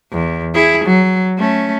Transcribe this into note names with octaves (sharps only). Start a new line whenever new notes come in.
E2
E4 G#4
F#3
A3 C#4